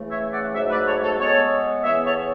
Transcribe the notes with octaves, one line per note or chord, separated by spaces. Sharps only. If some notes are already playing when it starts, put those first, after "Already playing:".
Already playing: C#3 E3 A3
C#5 E5
D5 F#5
G#2 F#3 A3 C#5 E5
B4 D5
A4 C#5
A4 C#5
C#3 G#3 B3 A4 C#5
C#3 E3 B3 C#5 E5
A4 C#5